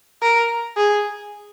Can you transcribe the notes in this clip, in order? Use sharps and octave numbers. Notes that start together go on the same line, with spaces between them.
A#4
G#4